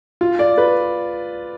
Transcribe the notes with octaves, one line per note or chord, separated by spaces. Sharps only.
F4
D5
B4